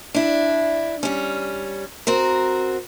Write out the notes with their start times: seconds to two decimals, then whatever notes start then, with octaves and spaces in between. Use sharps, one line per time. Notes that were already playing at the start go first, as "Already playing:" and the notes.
0.14 D4 E4
1.03 G3 C#4
2.07 C4 F#4 A#4